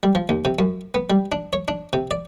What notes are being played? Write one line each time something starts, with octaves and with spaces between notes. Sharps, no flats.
G3
F3
D#2
C3
F#2
B3
G3
D4
C#5
D4
C3
D5